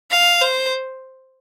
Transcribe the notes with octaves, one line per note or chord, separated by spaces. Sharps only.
F5
C5